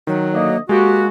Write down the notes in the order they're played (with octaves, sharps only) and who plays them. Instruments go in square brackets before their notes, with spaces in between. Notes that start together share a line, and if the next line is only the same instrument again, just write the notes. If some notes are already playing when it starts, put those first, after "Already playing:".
[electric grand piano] D#3 [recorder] F#3
[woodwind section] D2 A#3 D#5
[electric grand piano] G#3 [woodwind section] A#3 F#4 [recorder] G4